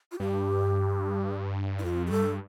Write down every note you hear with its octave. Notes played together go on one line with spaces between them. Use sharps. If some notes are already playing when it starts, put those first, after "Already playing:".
F4
G2 G4
D#4
F2 F4
G4
G2 A4